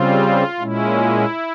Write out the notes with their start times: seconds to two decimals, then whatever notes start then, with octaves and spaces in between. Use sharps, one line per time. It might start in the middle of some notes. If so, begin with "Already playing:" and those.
Already playing: C#3 G3 C4 F4
0.60 A#2 G#3 C#4 E4